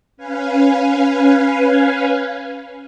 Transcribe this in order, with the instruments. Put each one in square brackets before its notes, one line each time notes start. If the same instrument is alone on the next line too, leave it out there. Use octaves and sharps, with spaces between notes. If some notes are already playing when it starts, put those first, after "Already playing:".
[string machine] C#4 B4 F5 G#5